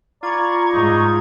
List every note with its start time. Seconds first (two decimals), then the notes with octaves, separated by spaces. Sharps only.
0.23 F4 D5 A#5 B5 C#6 G#6
0.73 G#2 D#4